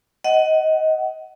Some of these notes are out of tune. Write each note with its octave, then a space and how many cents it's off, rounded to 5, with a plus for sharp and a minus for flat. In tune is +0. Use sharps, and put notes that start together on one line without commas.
D#5 +15 F#5 +25